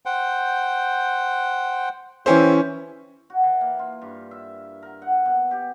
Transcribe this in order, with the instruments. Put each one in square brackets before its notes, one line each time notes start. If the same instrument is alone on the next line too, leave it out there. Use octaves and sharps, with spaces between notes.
[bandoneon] C5 F#5 G5
[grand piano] E3 C#4 C5 [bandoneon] G4 E5
[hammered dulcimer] F#4
E3
A#3
F4
G2
E5
A#4
F#5
B2
G4